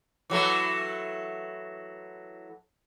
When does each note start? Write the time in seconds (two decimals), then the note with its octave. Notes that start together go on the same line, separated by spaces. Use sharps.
0.30 E3 F#3 A3